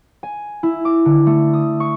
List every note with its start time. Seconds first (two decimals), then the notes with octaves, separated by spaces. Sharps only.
0.23 G#5
0.63 E4
0.85 D6
1.06 D3
1.27 A3
1.54 D#6
1.80 C#6